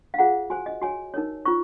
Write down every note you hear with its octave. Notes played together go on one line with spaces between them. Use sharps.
F5
F4 G#4 C5 F#5
F#4 C5 G#5
D#5
F#4 C#5 G#5
D#4 A#4 C#5
F4 C5 C#6